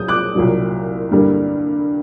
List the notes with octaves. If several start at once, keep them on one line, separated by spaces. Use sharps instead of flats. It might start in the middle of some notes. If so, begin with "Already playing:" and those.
Already playing: C2 A#2 F#3 D#6 G6
D6 F#6
C2 A#2 F#3 A#3
G2 D3 G3 A#3